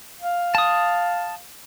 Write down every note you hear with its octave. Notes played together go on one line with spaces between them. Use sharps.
F5
A5 D#6